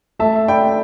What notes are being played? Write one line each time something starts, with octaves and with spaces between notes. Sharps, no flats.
A3 E5 A5
D4 G5 B5